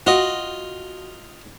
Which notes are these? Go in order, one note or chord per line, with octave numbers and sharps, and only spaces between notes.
F4 F#4 D#5